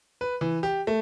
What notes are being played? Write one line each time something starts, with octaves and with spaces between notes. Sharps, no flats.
B4
E3
G4
A3